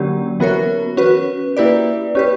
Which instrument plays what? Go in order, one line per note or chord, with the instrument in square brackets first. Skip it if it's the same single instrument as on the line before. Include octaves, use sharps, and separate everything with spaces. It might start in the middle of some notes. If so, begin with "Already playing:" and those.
Already playing: [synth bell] D3 F#3 A#3 C#4 G4
E3 B3 F#4 A#4 C#5
C#4 F#4 B4
A#3 E4 G4 B4 D5
C#4 G4 B4